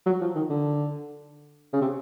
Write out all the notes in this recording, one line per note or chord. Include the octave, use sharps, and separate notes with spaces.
F#3
F3
D#3
D3
C#3
C3